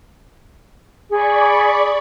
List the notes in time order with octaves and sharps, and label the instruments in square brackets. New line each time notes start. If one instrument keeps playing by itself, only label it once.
[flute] G#4 [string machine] D5 B5 C#6